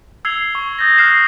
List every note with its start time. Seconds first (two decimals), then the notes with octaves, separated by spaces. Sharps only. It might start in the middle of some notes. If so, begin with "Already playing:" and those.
0.25 E6 G#6 C7 F7 G7
0.55 C#6
0.79 D#6 G6 A6 A#6
0.98 D#6 F6 F#6 A#6 C7 E7